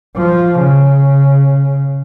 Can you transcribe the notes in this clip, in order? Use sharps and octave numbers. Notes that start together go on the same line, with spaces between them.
F3
C#3